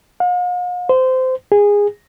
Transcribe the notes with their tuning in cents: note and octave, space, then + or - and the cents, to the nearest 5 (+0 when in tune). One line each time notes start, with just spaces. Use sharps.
F5 +45
C5 -20
G#4 -20